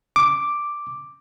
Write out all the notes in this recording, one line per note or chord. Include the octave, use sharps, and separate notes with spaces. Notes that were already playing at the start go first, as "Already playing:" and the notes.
D6